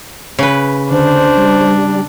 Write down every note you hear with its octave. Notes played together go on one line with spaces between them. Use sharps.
C#3 B4
D3 D4 C5
G3